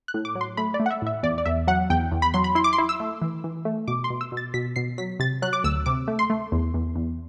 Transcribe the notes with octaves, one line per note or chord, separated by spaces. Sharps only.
F#6
A2
D6
F#3
C6
A3 B5
D5
A3
F#5
E5
A2 E5
E2 D5
D5
E2 E5
F#3 F#5
E2 G5
E2
B5
F#3 C6
B5
E4 C6
D6
C6
E4
E6
A3
E3
E3
A3
B2 D6
C6
B2
E6
B2
A6
B2 B6
B2 C7
F#3 B6
C3 A6
F#3 F#6
D6
D2 E6
C3 D6
A3
C6
A3
E2
E2
E2